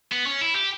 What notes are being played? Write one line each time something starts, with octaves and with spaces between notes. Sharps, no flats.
B3
C#4
E4
G4